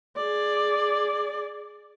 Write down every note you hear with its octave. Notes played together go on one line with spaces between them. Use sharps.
G#4 D5